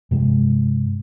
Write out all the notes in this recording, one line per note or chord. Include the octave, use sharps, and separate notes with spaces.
G2 C3 G#3